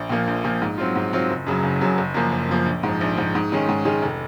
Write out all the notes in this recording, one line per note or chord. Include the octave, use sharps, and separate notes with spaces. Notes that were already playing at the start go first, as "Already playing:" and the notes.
Already playing: A#1
A#2 F3 A#3
A#1
A#2 F3 A#3
G#2
F#3 C4 F4
G#2
F#3 C4 F4
F#1
F#2 C#3 F#3
F#1
F#2 C#3 F#3
F#1
F#2 F3 A#3
F#1
F#2 F3 A#3
A#1
G#2 F3
A#1
G#2 F3
G#2
D#3 G#3 C#4
G#2
D#3 G#3 C#4
F1